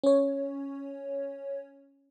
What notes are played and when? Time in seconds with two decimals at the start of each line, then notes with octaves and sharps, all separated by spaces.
0.04 C#4 C#5